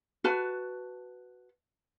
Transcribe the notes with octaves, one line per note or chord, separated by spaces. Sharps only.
F#4 B4 A5